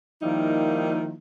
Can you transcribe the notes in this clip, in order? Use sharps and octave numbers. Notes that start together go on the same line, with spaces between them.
D#3 F3 G3 A#3 D#4 E4